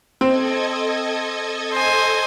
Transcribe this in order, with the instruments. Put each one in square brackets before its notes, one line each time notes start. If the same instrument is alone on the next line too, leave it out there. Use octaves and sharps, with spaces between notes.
[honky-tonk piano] C4 [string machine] A4 D#5 G#6
[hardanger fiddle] C5 G#5